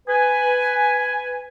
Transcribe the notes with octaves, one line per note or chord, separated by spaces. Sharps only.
B4 G#5